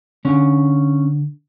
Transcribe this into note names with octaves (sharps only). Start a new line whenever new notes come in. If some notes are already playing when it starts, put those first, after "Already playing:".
D3 C#4